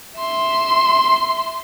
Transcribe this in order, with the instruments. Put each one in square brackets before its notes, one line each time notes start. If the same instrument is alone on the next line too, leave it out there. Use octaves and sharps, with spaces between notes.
[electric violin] E5 C6